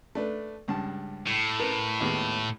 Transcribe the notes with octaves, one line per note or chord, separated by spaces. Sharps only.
A3 D4 B4
C#2 G2 A5
A2
A#4 B4
D#2 G#3 B3